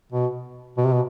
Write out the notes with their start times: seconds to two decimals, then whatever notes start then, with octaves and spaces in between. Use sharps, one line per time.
0.12 B2
0.77 B2
0.85 C3
0.94 B2